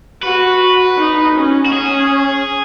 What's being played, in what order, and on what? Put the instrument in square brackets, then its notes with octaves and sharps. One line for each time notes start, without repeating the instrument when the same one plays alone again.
[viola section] F#4 [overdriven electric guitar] B4
[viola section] D#4
C#4
[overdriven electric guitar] F#4
[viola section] C#4 [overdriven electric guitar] G#4